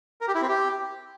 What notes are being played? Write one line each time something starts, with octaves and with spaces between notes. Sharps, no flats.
A#4
G4
E4
C4
G4